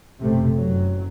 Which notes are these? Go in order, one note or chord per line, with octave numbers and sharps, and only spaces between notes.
F#1 C3 A3
F#1 F#3